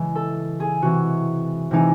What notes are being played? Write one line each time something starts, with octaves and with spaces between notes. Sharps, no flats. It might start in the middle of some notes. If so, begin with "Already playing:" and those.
Already playing: C#3 E3 G#3
A4
G#4
C3 E3 G#3 F#4
C3 E3 G#3 D#4